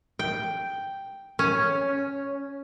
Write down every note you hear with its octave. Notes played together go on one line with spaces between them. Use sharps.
G5
C#4